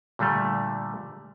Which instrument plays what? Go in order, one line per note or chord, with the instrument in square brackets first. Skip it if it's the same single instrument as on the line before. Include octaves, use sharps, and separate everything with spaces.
[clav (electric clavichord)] A#2 D3 G3 A3